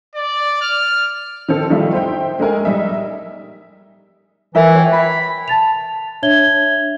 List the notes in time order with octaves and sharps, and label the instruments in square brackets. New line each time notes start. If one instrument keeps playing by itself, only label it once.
[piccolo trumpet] D5
F6
[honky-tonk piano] D#3 C4 A4
D#3 G3 A3 D#4 F4
C5 E5 G5
G#3 A3 A#4 G#5
G3 D#4 D#5 E5
[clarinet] E3 [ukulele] A#4 E5
[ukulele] C#5 G5
[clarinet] B5
[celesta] A5 A6 F7
D4 C#5 E5 G#6 G7